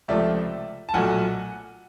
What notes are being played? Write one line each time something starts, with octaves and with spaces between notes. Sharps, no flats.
C#2 C3 F3 A3 D5 E5
A5
B1 A#2 F#3 A3 F#5 G#5